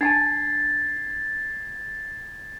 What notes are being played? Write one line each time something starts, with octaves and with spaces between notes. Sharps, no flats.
D4 G#5 A5 G#6 A6 C7